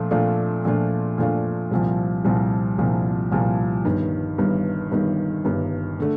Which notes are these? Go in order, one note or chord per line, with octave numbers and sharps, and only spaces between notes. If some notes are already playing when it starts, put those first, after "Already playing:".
Already playing: A#2 F3 A3 D4 F4
A#2 F3 A3 D4 F4
A#2 F3 A3 D4 F4
A#2 F3 A3 D4 F4
C2 A#2 F3
C2 A#2 F3
C2 A#2 F3
C2 A#2 F3
G1 G2 D#3
G1 G2 D#3
G1 G2 D#3
G1 G2 D#3
D3 A3